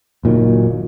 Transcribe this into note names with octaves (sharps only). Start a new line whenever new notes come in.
F#1 A#2 D#3 F#3